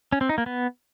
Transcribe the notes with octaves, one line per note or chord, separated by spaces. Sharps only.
C#4
C4
D#4
A#3
B3